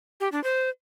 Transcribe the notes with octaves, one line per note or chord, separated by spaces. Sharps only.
G4
D4
C5